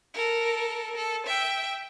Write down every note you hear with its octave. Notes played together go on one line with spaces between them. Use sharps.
A4 A#4
A4
E5 G5